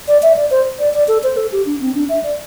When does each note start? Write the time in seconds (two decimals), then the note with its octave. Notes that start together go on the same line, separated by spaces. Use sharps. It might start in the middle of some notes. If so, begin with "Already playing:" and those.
0.08 D5
0.23 E5
0.37 D5
0.51 C5
0.79 D5
0.94 D5
1.08 A4
1.23 C5
1.37 A4
1.52 G4
1.66 D4
1.81 C4
1.95 D4
2.09 E5
2.23 D5